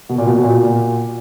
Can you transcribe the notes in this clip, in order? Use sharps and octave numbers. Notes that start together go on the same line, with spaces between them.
B2
A#2
B2
B2
A#2